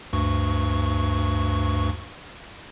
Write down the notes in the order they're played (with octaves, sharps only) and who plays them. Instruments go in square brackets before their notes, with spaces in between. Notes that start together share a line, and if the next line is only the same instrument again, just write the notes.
[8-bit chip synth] D2 G2 C#6